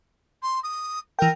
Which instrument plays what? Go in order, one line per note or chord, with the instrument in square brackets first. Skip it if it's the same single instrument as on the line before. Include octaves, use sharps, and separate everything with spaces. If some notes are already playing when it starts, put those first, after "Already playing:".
[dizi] C6
D#6
[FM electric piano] E3 G5 [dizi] A#4